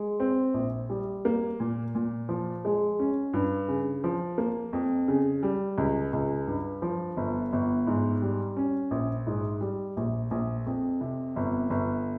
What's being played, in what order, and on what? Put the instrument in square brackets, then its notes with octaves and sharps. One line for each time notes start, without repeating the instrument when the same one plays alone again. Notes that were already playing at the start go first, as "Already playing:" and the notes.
Already playing: [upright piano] G#3
C4
A#1
G3
A#3
A#2
A#2
F3
G#3
C#4
G2
C#3
F3
A#3
F2
C#3
G3
C#2
C#2
G2
F3
G1
G1
G#2
G3
C#4
A#1
G#2
G3
A#1
A#1
F2
C3
G1
G1